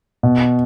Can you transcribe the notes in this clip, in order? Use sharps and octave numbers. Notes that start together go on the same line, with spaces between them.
B2